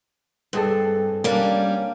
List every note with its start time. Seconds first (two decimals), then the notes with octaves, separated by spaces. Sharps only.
0.53 G2 C4 G#4 A4
1.24 G3 A#3 C#4 D4